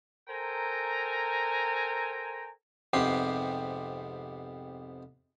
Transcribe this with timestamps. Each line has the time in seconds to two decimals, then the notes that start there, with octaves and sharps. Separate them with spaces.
0.28 A4 A#4 C5 G5 G#5 A#5
2.93 F2 G#2 C3 B3 G4 C6